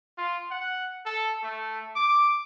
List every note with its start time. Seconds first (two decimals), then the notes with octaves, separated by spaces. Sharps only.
0.18 F4
0.51 F#5
1.06 A4
1.43 A3
1.96 D6